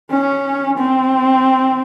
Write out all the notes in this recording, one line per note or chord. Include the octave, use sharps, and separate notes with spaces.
C#4
C4